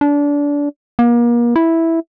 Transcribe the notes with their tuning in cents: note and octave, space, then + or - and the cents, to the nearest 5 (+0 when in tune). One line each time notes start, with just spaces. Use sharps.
D4 -25
A#3 +35
E4 -5